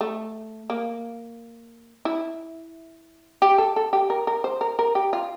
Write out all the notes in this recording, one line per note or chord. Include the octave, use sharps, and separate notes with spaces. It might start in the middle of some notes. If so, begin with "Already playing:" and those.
A3
A#3
E4
G4
A4
A4
G4
A#4
A#4
C5
A#4
A#4
G4
F4